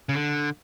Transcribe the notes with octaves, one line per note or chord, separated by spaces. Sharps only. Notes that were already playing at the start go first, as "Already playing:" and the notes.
C#3
D3